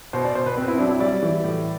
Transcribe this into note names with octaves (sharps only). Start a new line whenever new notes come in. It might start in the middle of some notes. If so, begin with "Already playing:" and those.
B2 C5
D5
B2 C5
B4
C4 B4
E4
F#3 D4
E4
G3 D5
E3
A2